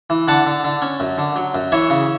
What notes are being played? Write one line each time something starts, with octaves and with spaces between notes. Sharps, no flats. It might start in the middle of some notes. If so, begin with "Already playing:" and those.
E3
D3 F#5 A5
D3
D3
C#4
F#2
D3
F#3
F#2
E3 C#5 E5
C#3